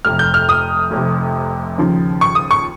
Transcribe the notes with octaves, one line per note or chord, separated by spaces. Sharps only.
F1 F2 C3 F6
G6
F6
D#6
F1 F2 C3
D#2 C#3 F3
C#6
D#6
C#6